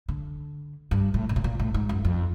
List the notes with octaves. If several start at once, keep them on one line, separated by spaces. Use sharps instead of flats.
D3
G2
A2
A#2
A2
A#2
A2
G#2
F#2
F2